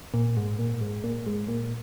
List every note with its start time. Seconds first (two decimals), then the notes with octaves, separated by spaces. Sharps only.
0.14 A#2
0.37 G#2
0.59 A#2
0.81 G#2
1.04 A#2
1.26 G#2
1.48 A#2